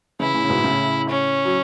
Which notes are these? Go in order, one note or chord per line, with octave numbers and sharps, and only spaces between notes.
C#3 E3 E4
A2 C#3
C#3
G#2 B2
A2 C#3
C#4
F#3